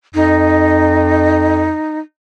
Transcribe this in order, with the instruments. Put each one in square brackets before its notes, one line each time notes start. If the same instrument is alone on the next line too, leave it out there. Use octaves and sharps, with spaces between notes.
[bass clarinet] F2 [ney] D#4